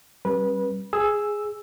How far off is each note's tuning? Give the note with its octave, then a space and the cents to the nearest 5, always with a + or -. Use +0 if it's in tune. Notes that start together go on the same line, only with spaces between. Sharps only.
G3 -10 C#4 -45 B4 -25
G#4 +0 E6 +0